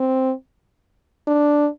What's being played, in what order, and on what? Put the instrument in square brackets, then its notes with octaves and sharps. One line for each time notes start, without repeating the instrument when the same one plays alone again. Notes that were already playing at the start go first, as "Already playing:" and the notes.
Already playing: [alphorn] C4
D4